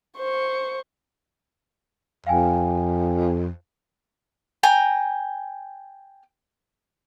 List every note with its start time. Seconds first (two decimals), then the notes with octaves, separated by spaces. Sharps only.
0.17 C5 C#6
2.27 F2 F5 G5 G#5
4.63 G5 G#5 A#5